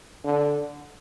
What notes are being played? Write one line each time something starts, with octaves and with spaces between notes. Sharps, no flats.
D3